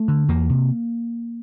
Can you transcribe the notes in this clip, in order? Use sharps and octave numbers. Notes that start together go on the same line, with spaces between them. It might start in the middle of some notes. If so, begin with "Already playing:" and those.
Already playing: A3
D3
E2 A#3
C3